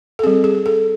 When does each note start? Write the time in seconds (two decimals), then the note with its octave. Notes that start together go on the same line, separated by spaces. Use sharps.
0.19 A4
0.23 G3 C4 G#4
0.44 G#4
0.66 A4